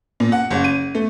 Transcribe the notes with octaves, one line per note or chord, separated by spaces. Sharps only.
A#2
F#5
F#1
D#7
A3